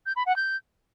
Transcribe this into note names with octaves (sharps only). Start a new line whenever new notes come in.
G6
B5
F#5
G6